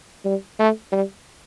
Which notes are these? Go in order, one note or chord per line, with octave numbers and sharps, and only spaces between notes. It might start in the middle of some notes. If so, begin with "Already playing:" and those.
G3
A3
G3